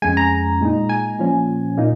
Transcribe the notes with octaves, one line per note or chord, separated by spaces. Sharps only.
F2 C#3 G#3 G#5
A#5
A#2 G#3 D#4
G#5
A#2 F3 C#4
A#2 A#3 D#4